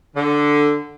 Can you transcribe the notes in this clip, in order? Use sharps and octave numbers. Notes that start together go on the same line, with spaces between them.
D3